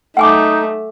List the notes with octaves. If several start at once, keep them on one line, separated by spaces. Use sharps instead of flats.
A3 D#4 F#5 G#5 D6